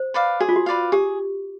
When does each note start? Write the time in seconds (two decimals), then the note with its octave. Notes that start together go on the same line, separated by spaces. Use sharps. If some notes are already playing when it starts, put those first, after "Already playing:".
Already playing: C5
0.14 B4 D5 F5
0.40 F#4 G#4
0.49 F4
0.56 F#4
0.66 B4 D5 F5
0.92 G4 G#4